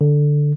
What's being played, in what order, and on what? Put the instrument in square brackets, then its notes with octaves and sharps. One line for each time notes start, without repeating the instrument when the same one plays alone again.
[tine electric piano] D3